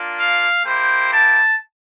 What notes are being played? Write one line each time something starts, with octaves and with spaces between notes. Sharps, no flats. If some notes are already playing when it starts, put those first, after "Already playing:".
Already playing: A#3 D4 F4
F5
A#3 E4 G4 C5
A5